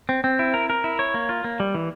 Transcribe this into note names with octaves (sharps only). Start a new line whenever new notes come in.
C4
C4
E4
A#4
A#4
E4
C#5
A#3
F4
A#3
G3
E3